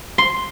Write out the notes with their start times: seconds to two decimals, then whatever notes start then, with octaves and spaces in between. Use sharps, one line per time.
0.18 C6